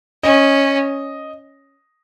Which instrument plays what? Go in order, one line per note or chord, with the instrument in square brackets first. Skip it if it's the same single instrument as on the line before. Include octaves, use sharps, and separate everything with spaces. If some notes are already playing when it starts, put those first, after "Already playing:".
[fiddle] C#4 [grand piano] D#5